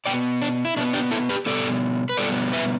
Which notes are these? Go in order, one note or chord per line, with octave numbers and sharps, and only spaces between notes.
B2 B3 D5 G5
D4
E4
B2 B3 D4
D4 G4
E4 A4
G4 B4
B2 G3 B3 A4 D5
B4
B2 G3 B3 A4 D5
B4 E5